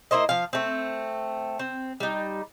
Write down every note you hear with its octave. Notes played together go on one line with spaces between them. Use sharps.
A#3 E4 C5 D#5
F3 F5
A3 C4
C4
G3 D#4